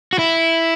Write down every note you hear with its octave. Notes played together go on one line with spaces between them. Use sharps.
F#4
E4